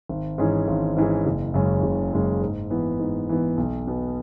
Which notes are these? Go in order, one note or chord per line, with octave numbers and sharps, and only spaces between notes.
G#1
G#2 E3 C#4 G#4
G#1
G#2 E3 C#4 G#4
F#1
F#2 C#3 G#3 C#4
F#1
F#2 C#3 G#3 C#4
G#2
E3 B3
G#2
E3 B3
B1
B2 B3